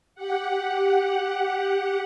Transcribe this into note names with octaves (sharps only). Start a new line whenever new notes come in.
G4 F#5